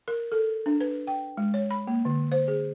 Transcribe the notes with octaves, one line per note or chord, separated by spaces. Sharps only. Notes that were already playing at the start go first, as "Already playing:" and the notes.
A#4
A4
D4
B4
G5
G#3
C#5
B5
A#3
D3
C5
G#4